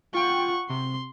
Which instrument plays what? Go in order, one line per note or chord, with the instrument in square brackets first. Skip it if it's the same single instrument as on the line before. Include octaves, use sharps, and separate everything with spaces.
[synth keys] F4 G5 [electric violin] F#5 C#6
[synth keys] C3 [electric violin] C6